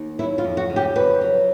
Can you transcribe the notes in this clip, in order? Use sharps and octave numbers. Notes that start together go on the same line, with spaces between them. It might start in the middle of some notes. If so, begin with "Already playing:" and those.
Already playing: D#2
F#3 E4
F4
F2
F#4
C#3
G4
F2 B4
F#3